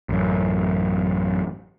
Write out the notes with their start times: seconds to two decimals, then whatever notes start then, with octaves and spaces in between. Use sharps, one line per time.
0.09 A1 F#2